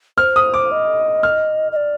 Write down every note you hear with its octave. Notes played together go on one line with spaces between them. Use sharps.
C5 F6
D#6
D6
D#5
F6
D#5
D5